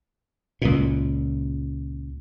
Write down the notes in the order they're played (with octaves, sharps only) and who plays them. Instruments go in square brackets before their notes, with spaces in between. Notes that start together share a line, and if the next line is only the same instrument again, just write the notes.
[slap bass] C#2 A#2